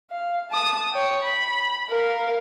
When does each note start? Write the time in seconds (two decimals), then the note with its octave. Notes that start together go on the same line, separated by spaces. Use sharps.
0.11 F5
0.51 A5 D#6
0.93 C#5 G5
1.22 B5
1.89 A#4 F5